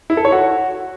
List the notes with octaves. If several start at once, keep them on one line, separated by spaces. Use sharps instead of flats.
E4
A4
C#5
F#4